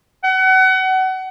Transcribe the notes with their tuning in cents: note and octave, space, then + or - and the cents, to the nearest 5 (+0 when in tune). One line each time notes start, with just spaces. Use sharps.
F#5 +30